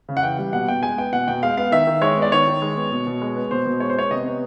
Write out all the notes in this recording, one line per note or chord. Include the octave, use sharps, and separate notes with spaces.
C#3
F#5
E3 G5
G3
B2 F#5
B2 G5
G#3 G#5
B3 G5
B2 F#5
B2 G5
G#3 F5
B3 F5
D#3 E5
D#3
G#3 C#5
B3
D5
D#3 C#5
D#3
G#3
B3
B2
B2
G#3
B3
B2 C5
B2
G#3 C#5
C5
B3 C#5
C3 D#5
B3